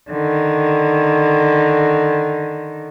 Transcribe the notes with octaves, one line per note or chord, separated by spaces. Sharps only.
D3 D#3